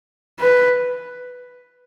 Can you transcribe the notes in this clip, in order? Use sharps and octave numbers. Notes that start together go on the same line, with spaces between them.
B4